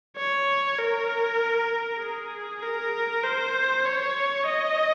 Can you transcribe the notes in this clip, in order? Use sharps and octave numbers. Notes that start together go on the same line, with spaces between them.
C#5
A#4
G#4
A#4
C5
C#5
D#5